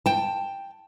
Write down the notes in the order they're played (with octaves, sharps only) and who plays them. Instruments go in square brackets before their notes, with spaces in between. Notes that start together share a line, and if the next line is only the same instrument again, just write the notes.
[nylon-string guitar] G5 A5